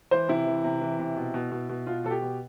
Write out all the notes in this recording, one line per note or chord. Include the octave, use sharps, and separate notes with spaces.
E3 C5
C3 E4
E3
C3
E3
C3
B2
B2
B2
B2
B2 F4
B2 A4
G4
B2